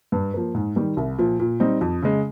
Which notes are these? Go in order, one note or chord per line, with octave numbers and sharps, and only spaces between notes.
G2
F3 A#3
G#2
D#3 G3
C2
A#2 F3
A#2
G3 C4 D#4
F2
C#3 G#3